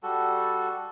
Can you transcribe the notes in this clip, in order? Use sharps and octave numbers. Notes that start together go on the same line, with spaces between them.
G3 F#4 A4